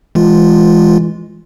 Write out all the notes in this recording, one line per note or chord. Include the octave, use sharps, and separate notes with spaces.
E3 G#3 F4